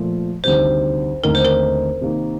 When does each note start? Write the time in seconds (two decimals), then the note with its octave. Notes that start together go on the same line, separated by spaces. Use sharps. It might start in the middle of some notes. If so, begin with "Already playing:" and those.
Already playing: A#2 F3 A3
0.44 D2 C3 D#3 G3 C5
1.23 D#2 D3 A3 C4 D#4 A#4
1.35 C5
1.45 A#4
2.01 C3 D#3 A#3